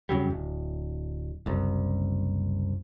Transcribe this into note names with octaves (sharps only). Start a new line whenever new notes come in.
F2 C#3 F#3 G3
D1
F#1 C2